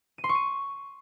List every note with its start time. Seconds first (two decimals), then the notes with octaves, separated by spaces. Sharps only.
0.18 D#7
0.24 C6
0.29 C#6
0.35 D#7